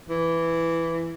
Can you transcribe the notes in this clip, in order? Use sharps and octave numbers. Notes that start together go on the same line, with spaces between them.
E3